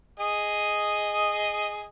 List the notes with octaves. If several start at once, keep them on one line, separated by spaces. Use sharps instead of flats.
G#4 D#5